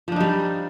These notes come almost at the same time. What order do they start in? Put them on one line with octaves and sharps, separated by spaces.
F3 D4 D#4 G3